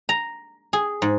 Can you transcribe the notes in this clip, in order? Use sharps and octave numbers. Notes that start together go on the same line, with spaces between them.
A#5
G#4
G#2